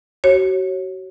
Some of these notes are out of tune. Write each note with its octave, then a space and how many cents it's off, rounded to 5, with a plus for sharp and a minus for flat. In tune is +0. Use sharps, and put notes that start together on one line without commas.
F#4 +35 C#5 -20